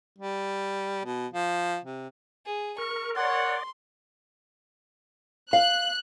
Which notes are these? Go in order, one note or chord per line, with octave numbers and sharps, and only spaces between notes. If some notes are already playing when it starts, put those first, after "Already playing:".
G3
B2
F3
C3
G#4
A#4 C#6
A#4 C#5 D5 F#5 C6
F5 F#6